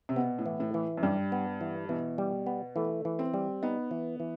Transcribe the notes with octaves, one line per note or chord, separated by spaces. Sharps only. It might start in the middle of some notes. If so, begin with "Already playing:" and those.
C3
B2 B3
A2
E3
A2
E3
F#2
G2 G3
B3
E3
B2 E3
G3
B3
E3 A3
E3
C4
G3
B3 D#4
E3
E3